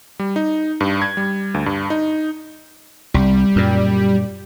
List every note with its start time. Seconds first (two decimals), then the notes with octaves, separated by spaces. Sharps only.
0.19 G3
0.36 D#4
0.81 G2
1.02 G#6
1.17 G3
1.54 D2
1.66 G2
1.90 D#4
3.14 C2 G3
3.56 F#2 A#2